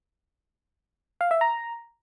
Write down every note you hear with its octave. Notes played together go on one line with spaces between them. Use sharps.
F5
E5
A#5